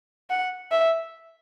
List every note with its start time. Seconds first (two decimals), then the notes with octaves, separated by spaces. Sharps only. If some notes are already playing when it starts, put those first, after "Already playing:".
0.30 F#5
0.72 E5